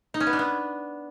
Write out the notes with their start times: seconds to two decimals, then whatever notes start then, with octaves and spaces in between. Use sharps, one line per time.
0.14 D#4
0.20 C#4
0.27 B3
0.33 D4
0.39 B3